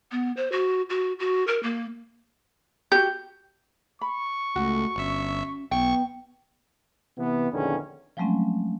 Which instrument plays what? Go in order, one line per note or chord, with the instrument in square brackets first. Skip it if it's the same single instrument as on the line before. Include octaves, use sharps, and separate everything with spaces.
[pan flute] B3
C5
F#4
F#4
F#4
A#4
A#3
[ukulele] F#4 G4 [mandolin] G6
[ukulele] B5 [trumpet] C#6
[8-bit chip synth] C#2 [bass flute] A3 [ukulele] F#4
[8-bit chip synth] G1 E5 [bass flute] C#4
[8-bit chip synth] B1 C#6 [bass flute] B3 [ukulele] G5
[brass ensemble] C3 E3 B3
A#1 E2 D3 D#3 C#4
[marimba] F3 F#3 G#3 A3 C4 C#4